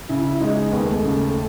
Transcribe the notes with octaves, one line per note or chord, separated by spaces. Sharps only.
C#3 E4
E4
G#3 D#4
D#4
D#2 B3
A3
C#3